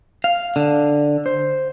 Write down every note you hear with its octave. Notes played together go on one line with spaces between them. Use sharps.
F5
D3
C5